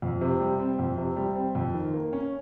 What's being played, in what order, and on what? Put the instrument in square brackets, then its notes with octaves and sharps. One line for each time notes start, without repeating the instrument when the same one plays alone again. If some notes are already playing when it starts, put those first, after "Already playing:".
[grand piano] F2
C3
G3
C4
F2
C3
G3
C4
F2
D#3
A#3
C#4